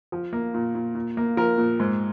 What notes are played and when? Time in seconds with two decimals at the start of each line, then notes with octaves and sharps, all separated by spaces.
0.12 F3
0.33 A#3
0.54 A#2
0.75 A#2
0.95 A#2
1.17 A#3
1.37 F3 A#4
1.58 A#2
1.80 G#2